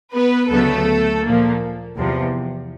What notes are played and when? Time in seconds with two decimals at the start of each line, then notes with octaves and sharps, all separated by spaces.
0.14 B3 B4
0.51 D2 C#3 F#3 A3 B3 A4
1.23 A#2 F3 A#3
1.96 E2 C3 F3